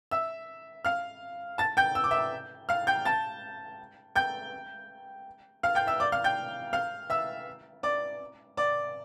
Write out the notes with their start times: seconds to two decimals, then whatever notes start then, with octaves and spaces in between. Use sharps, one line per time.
0.11 E5 E6
0.85 F5 F6
1.58 A5 A6
1.77 G5 G6
1.95 E6
2.04 D6
2.11 E5 E6
2.69 F5 F6
2.87 G5 G6
3.05 A5 A6
4.15 G5 G6
5.63 F5 F6
5.75 G5 G6
5.87 E5 E6
6.00 D5 D6
6.12 F5 F6
6.24 G5 G6
6.73 F5 F6
7.10 E5 E6
7.83 D5 D6
8.57 D5 D6